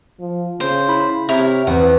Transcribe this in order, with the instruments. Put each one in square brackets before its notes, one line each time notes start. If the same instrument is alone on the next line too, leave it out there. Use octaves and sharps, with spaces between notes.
[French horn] F3
[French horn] C#3 [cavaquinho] C5
[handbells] E4 B5
[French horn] C3 [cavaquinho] E4 A#4 C#5 [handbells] G6
[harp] E2 [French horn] C4 [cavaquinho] F#5